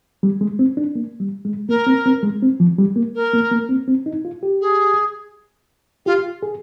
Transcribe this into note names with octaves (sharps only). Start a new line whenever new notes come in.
G3
G#3
C4
D4
A#3
G3
G#3
A#3 A#4
C4
C4
G#3
C4
F3
G3
A#3
A#4
A#3
A#3
C4
C4
D#4
F4
G4
G#4
F4 G4
G#4